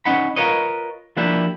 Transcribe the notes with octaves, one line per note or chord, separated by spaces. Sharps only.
C#4 D#4 F#5 B5
F4 A#4 B4 C#5 D#5
F3 A#3 D4 E4 G4